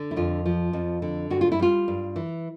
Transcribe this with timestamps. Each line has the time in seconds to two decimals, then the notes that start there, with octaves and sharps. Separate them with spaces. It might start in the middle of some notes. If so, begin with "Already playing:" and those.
Already playing: D3
0.11 E4
0.16 F2 F4
0.46 F3
0.73 F2
1.02 D3
1.30 G2 F#4
1.41 F4
1.52 E4
1.59 G3 F4
1.88 G2
2.16 E3